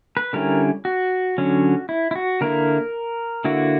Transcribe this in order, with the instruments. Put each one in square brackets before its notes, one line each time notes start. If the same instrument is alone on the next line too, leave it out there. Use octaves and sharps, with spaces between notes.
[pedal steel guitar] B4
D3 G3 C#4 E4 A#4
F#4
D3 F#3 C#4
E4
E4
F#4
D3 A#3 E4 A#4
D3 A#3 E4 F#4